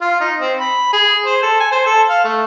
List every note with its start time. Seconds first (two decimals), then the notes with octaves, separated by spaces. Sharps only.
0.01 F4
0.20 D#4
0.40 C4
0.58 B5
0.93 G#4
1.25 C5
1.43 A4
1.60 G#5
1.71 C5
1.86 A4
2.09 F5
2.24 A3